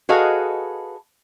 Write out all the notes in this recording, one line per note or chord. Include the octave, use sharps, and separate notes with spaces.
F#4 G#4 A4 B4 D#5 F5